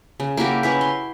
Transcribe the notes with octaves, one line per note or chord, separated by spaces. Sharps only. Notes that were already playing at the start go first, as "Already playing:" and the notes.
C#3
A#3 E4 F#4 G4
C#4 E4 B4
C6